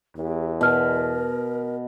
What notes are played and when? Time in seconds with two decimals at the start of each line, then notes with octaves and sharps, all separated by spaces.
0.17 E2 G4
0.61 B2 A#4 A5 F6